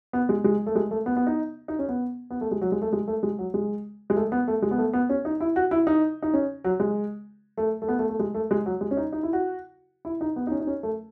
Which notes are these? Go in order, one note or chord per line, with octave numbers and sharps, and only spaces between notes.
B3
G#3
G#3
A3
G#3
A3
B3
B3
D#4
D#4
C#4
B3
B3
A3
G#3
F#3
G#3
A3
G#3
A3
G#3
F#3
G#3
G#3
A3
B3
A3
G#3
B3
A3
B3
C#4
D#4
E4
F#4
E4
D#4
D#4
C#4
F#3
G#3
A3
A3
B3
A3
A3
G#3
A3
G#3
F#3
G#3
C#4
D#4
D#4
E4
F#4
E4
D#4
B3
D#4
C#4
D#4
C#4
A3